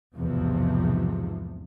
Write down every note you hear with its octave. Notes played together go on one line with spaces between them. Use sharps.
F1 B1 E2 G#2 C3 F3